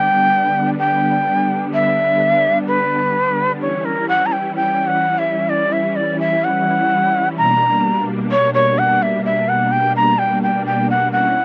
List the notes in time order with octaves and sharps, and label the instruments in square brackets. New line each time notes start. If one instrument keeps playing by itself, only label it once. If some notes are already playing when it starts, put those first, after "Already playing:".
Already playing: [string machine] D3 G3 B3 D4 [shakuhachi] G5
[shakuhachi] G5
E5
B4
[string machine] E3 G3 C#4 E4 [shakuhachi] C#5
[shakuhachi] A#4
F#5
A#5
G5
G5
F#5
E5
D5
E5
D5
E5
F#5
[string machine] B2 G3 A#3 D4 [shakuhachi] A#5
[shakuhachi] C#5
C#5
F#5
E5
E5
F#5
G5
A#5
G5
G5
G5
F#5
[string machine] C#4 E4 [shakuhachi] F#5